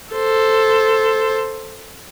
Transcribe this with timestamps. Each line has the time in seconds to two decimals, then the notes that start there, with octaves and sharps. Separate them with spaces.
0.14 A4 C5